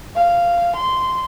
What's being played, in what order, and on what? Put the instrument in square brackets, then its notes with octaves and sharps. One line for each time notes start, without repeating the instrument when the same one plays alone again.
[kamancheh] F5
C6